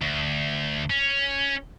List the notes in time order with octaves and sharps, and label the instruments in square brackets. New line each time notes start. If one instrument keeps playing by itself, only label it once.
[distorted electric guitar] D2
C#4